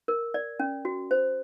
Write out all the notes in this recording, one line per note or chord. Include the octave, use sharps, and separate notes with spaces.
A#4
D5
C#4
F#4
C5